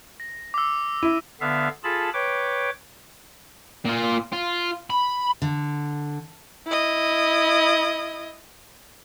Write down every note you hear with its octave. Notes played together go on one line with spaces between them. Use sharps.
A#6
D6 E6
E4 D#7
D3 B3 E5 F5
F4 G#4 A4 A5 B5
B4 C#5 G5 D6
A#2 F4
F4
B5
D3
E4 D#5